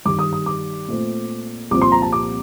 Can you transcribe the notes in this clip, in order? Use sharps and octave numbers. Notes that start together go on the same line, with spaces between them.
G2 D#3 G3 D6
D#6
D#6
D6
A#2 A3 C4
C2 A#2 F3 C4 D6
C6
A#5
A5
D6